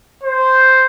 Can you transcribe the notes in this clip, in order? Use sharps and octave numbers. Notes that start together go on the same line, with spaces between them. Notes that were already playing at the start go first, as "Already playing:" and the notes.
C5